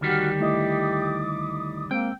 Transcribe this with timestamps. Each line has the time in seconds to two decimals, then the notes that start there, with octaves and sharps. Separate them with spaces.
0.01 D2 D#3 G3 F#4 G4 F6
0.40 A3 E4 D#5 D6 D#6
1.91 G#3 A#3 C4 G5 E6